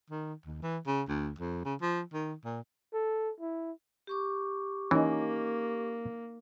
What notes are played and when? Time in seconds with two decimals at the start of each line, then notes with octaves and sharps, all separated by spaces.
0.10 D#3
0.46 D#2
0.62 E3
0.87 C#3
1.08 D2
1.39 F2
1.65 C#3
1.82 F3
2.13 D#3
2.45 A#2
2.93 A4
3.40 E4
4.07 G4 C#6 D6
4.91 E3 A#3 C#4 D#4